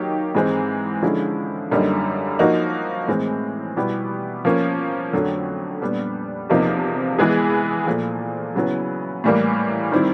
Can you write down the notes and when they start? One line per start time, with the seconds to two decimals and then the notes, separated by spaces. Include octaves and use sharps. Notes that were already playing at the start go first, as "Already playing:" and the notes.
Already playing: D#3 F#3 A#3 D#4 G4
0.35 G#2 E3 G#3 C4
1.02 D3 F3 G#3 C#4 E4
1.71 F#2 D3 G3 A#3 D#4
2.39 F3 A#3 D#4 F#4
3.08 A2 E3 G#3 C4
3.76 B2 G3 B3 E4 G4
4.45 F3 A#3 C#4
5.13 F2 D3 F#3 A3
5.81 A#2 G3 B3 D4
6.50 E2 C3 F3 A#3 D#4
7.19 E3 G#3 B3 E4 G#4
7.86 A#2 F3 A3
8.56 C#3 F#3 B3 E4
9.24 A2 E3 G3 A#3
9.92 D#3 G3 C4 E4